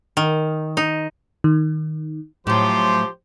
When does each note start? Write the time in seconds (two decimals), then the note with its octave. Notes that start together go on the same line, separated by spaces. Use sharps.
0.17 D#3
0.77 D#4
1.44 D#3
2.47 A2 F3 F#3 G4 C5